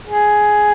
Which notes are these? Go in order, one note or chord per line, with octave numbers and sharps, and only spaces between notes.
G#4